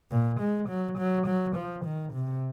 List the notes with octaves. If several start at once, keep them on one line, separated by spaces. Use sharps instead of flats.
A#2
G#3
F#3
F#3
F#3
F3
D#3
C3